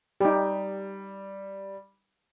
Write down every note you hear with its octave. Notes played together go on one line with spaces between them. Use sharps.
G3 D#4 G4